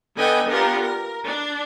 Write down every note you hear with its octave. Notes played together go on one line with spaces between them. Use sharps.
D3 B3 B4 D#5 G5 G#5
B3 D4 F4 G4 A#4
A#4
D4